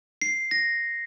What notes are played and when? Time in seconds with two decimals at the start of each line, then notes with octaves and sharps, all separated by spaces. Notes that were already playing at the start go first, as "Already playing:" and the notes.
0.22 C7
0.51 A#6